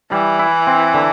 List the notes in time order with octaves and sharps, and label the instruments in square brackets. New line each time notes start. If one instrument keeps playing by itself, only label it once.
[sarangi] E3 [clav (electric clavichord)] G3
[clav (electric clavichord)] E4
C4
D3